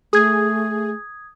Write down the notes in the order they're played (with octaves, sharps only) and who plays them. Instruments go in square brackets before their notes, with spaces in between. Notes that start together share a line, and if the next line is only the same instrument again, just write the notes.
[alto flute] A3 [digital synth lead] G#4 [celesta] D#6 G#6